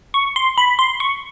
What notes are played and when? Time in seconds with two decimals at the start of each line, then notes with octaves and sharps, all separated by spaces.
0.14 C#6
0.36 C6
0.58 B5
0.79 C6
1.00 C#6